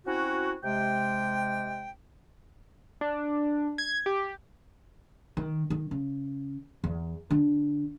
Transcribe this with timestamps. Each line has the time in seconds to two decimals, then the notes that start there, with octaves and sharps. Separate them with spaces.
0.06 C4 C#4 E4 F#4
0.63 C3 G#3 G5
3.01 D4
3.78 G#6
4.06 G4
5.37 D#3
5.70 D#3
5.91 C#3
6.84 E2
7.31 D3